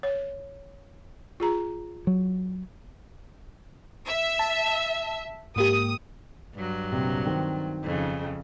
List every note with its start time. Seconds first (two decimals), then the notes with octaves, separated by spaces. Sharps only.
0.03 C#5
1.40 F4 G#4 A#5
2.07 F#3
4.07 E5
4.39 A5
5.56 G#2 A#3 G4 D#6
6.55 G2 F#3
6.92 A#1 C3
7.25 D#3 C4
7.84 F2 C#3